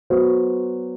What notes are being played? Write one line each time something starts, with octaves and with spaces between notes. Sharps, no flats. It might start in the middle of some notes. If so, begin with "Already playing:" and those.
F#3 B3 F#4 C5